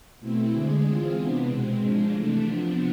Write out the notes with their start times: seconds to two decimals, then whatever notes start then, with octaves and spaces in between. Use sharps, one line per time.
0.20 B2 A3 C4 E4
0.51 D3 G#3 D4 G#4
0.83 E3 G#3 C4 F4 G#4
1.15 C3 E3 B3 D4
1.46 B2 G#3 C4
1.78 G#2 F3 G#3 D4
2.10 C3 E3 A3 D4
2.42 C3 F3 B3 D4